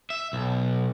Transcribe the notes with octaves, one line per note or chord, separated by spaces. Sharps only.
E5
B1